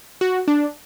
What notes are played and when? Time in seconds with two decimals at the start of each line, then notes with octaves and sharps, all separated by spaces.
0.21 F#4
0.48 D4